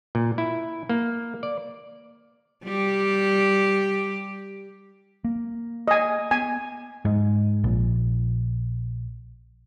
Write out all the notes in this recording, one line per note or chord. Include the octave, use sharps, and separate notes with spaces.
A#2
E4
A#3
D5
G3 G4
A#3
D#5 G#5
B3 G#5
G#2
A#1